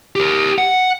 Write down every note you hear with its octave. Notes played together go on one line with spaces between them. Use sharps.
G4 A#4
F#5